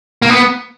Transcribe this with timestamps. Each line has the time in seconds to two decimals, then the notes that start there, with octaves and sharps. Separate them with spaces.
0.22 A#3
0.30 B3